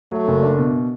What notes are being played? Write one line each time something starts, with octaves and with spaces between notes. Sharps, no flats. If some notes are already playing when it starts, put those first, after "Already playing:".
F#3 A3
F#1
D4
B2